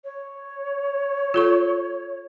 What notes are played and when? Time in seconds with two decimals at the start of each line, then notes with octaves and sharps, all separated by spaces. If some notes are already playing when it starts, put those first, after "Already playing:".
0.04 C#5
1.34 F4 A4 C#6